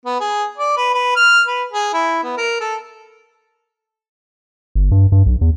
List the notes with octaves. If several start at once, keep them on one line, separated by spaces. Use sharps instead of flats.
B3
G#4
D5
B4
B4
F6
B4
G#4
E4
B3
A#4
A4
G1
G2
G2
B1
E2